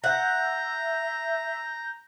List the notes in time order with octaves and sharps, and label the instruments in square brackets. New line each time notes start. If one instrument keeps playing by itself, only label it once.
[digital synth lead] E5 [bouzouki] F#5 [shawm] A#5 [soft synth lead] G6